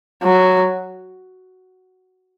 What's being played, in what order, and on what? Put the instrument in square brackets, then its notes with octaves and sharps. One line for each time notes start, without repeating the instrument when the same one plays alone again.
[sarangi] F#3